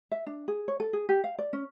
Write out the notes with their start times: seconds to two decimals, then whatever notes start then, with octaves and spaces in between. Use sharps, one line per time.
0.11 E5
0.27 D4
0.48 G#4
0.68 C#5
0.80 A4
0.93 G#4
1.09 G4
1.24 F5
1.38 D5
1.53 C#4